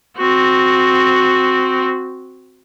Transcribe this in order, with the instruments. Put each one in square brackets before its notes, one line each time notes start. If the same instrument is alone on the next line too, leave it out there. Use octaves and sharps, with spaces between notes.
[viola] C4 F#4